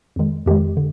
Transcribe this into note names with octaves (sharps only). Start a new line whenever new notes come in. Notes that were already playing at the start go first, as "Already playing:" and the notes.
F2 D#3 G#3
F2 D#3 G#3 G4
D3